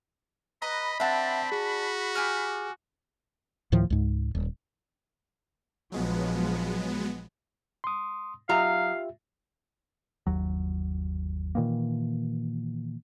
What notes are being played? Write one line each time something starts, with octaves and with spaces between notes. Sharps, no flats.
B4 D#5 A#5 B5
C4 D4 E5 F#5 A5
F#4 G#4
G4 G#5 F6
D2 A2 D#3 F3
C#2 G#2
D#1
A#1 F3 F#3 G#3 B3
C6 D#6
F#3 D#4 F4 G4 E5 F5 A#5
G1 D#2 F#3
A#2 D#3 E3 A#3